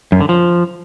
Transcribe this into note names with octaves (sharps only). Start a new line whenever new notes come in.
F#2
D3
F3